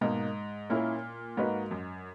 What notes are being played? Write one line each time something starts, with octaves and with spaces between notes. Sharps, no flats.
G#2 B2 A#3 D#4
A#2 A#3 C#4 E4 A#4
G#2 A#3 D#4 F#4 B4
F#2